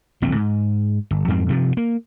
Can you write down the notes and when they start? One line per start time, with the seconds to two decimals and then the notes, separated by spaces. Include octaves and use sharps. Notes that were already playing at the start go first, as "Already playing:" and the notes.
0.22 D1 A#1 A2 C4
0.35 G#2
1.11 G1
1.28 F2 G#2 G3 C4
1.48 G2 C3 E3 F3
1.77 A#3